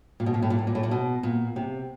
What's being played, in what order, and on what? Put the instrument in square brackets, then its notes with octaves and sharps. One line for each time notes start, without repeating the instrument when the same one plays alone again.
[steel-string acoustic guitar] A#2
B2
A#2
A2
A#2
A2
A#2
A2
A#2
B2
A#2
C3